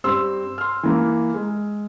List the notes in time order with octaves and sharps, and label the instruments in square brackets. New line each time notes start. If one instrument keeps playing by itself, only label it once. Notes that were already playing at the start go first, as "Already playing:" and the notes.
[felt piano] G2 C4 C6 E6
C6 F6
E3 A#3
G#3